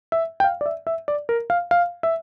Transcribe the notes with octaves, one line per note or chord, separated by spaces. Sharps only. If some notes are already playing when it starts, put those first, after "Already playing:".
E5
G5
F5
D5
E5
E5
D5
A#4
F5
F5
E5